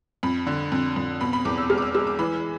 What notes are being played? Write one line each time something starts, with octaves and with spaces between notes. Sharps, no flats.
F2 B5
D3
F2
F2
B2 B5
B5
E2 D6
E6
G#3 F6
D6
E6
G#3 E6
D6
E3 B5